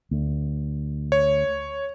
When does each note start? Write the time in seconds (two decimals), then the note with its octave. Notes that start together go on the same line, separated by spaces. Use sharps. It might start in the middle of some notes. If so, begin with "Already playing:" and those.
0.11 D2
1.12 C#5